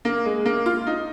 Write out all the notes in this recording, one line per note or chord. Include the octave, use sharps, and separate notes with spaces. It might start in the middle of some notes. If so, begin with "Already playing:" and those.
A#3
G#3
A#3
F4
D#4